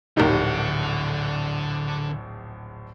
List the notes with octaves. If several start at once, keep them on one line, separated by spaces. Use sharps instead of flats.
D1 A#1 D3 D#4 G4 A#4 F#5